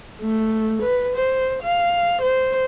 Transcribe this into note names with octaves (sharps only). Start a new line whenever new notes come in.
A3
B4
C5
F5
C5